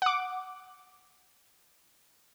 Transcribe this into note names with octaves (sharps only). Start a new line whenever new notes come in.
F#5 D6